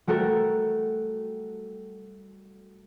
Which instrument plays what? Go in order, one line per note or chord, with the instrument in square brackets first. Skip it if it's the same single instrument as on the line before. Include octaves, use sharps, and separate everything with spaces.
[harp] G3 A3 F#4 A4 A#4